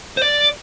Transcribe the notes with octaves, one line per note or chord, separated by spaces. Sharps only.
C5
D5